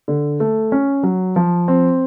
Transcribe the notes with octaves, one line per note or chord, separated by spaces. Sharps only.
D3
A3
C#4
F#3
F3
C4